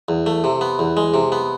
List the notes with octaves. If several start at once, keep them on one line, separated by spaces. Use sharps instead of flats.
E2
A3
C3
B3
E2
G#3
C3
B3